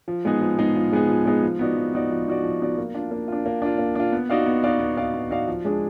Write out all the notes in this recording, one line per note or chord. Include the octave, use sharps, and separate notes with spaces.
F3
G#3 B3 D#4 G#4
F3
G#3 B3 D#4 G#4
F3
G#3 B3 D#4 G#4
F3
G#3 B3 D#4 G#4
F3
B3 D#4 F#4 D5
F3
B3 D#4 F#4 D5
F3
B3 D#4 F#4 D5
F3
B3 D#4 F#4 D5
A#3
D4 F4
A#3
D4 F4
A#3
D4 F4
A#3
D4 F4
B3
D#4 F#4 D5 F5
B3
D#4 F#4 D5 F5
B3
D#4 F#4 D5 F5
B3
D#4 F#4 D5 F5
F3
G#3 D4 G#4